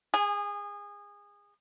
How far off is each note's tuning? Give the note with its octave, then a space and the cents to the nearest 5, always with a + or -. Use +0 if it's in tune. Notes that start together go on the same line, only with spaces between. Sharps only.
G#4 -25 G#5 +0